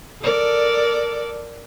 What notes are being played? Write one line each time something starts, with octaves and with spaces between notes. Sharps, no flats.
A4 A#4 D5